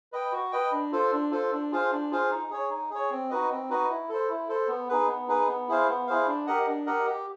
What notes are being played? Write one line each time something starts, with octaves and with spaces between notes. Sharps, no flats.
B4 D#5 G5
F#4
B4 D#5 G5
D4
F4 A4 C5
D4
F4 A4 C5
D4
F4 G#4 C5 F5
D4
F4 G#4 C5 F5
D#4
G#4 C#5
D#4
G#4 C#5
C4
D#4 F#4 B4 D#5
C4
D#4 F#4 B4 D#5
E4
A4 C5
E4
A4 C5
B3
D#4 G#4 B4
B3
D#4 G#4 B4
B3
E4 G#4 C5 F5
B3
E4 G#4 C5 F5
D4
G4 A#4 D#5 F#5
D4
G4 A#4 D#5 F#5
G4